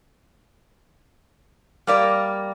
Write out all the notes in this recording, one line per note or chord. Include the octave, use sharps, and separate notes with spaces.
G3 A#3 D5